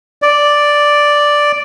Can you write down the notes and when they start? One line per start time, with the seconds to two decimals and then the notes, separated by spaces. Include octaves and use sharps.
0.22 D5